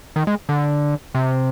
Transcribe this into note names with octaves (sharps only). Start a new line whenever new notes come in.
D#3
G#3
D3
C3